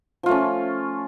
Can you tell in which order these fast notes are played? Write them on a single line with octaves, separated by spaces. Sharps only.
F3 F4 A3 C#4